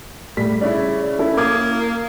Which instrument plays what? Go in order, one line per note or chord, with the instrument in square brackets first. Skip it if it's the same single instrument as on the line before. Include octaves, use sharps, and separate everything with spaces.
[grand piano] A2 G3 B6
[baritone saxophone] C#3 [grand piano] E4 C#5 D5
[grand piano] C#4 E4 A4
[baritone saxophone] A#3 [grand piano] D6 D#6 G#6